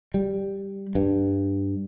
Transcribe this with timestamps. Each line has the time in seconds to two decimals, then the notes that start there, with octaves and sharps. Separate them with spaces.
0.14 G3
0.95 G2